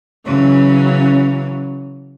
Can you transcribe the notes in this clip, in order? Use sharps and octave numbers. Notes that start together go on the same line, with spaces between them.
C#3 E3 F#3 C#4